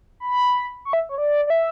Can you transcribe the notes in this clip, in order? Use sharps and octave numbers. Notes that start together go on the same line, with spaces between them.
B5
C#6
E5
C#5
D5
D5
E5